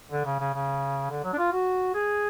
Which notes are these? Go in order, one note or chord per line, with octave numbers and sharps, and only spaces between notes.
D3
C#3
C#3
C#3
D3
F#3
D4
F4
F#4
G#4